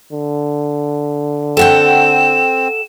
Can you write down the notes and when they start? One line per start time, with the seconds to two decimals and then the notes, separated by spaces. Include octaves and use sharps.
0.12 D3
1.57 C4 A4 F#5 G5 E7